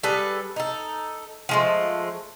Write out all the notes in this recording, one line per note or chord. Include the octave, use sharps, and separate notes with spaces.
G3 G#4 A4 B4
D#4 A4
F3 G#3 A3